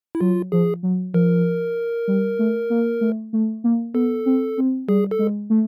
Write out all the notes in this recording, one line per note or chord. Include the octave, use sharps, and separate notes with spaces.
E4
F#3 F4
F3 G#4
F#3
F3 A#4
G3
A3
A#3
A3
A3
A#3
B3 A4
C4
C4
G3 G#4
A4
G#3
A3